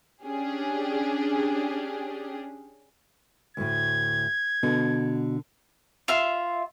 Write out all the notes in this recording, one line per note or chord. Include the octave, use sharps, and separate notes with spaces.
C#4 D4 G4 G#4
D2 A2 G#6
B2 D3
F4 E5 C6